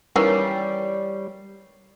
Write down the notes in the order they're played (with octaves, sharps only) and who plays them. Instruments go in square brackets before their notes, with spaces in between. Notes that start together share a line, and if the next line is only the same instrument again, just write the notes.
[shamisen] D#3 E3 C#4 [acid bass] G3 [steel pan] A#4 [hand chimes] C#5 C#6 C7